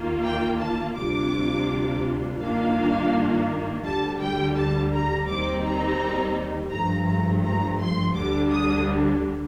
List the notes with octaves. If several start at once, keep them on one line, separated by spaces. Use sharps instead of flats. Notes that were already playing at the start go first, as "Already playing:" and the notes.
Already playing: D#2 D#3 A#3 F4
G5
A5
D2 C3 G3 D4 F4 D6
G2 D#3 A#3 D4 F4 F5
D2 D3 G3 A5
G5
A5
A#5
D#2 D#3 G3 C4 D#4 D6
A#5
G2 F3 A3 A#5
A#5
A#5
C6
D2 D3 G3 D4 D6
D#6